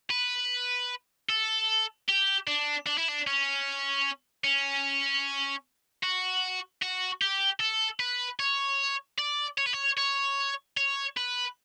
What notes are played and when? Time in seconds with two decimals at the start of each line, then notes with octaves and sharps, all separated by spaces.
0.10 B4
1.29 A4
2.09 G4
2.47 D4
2.87 D4
2.98 E4
3.09 D4
3.27 C#4
4.44 C#4
6.03 F#4
6.82 F#4
7.22 G4
7.60 A4
8.00 B4
8.40 C#5
9.19 D5
9.58 C#5
9.66 B4
9.73 C#5
9.98 C#5
10.77 C#5
11.17 B4